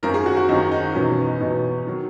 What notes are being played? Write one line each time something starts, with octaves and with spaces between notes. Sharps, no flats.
G#1 F#2 D#3 A#4
G#4
F#4
F#4
G#1 F#2 D#3 D#4
D#4
E2 B2 F#3 C#4
B3
D#4
E2 B2 F#3 D#4
D#3 F#3